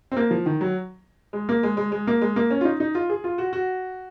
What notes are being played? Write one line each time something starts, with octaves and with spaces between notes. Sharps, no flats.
C4
A#3
F3
D#3
F#3
G#3
A#3
G#3
G#3
G#3
A#3
G#3
A#3
C#4
F4
D#4
D#4
F4
G#4
F4
F#4
F#4